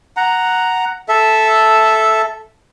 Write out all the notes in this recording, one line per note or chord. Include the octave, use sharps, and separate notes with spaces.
F#5 A#5
A4 E5